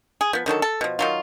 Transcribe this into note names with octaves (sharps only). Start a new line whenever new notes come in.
G#4
F3 B3
D3 D#3 F#3 A4
A4
B2 F3
D#3 F#3 F4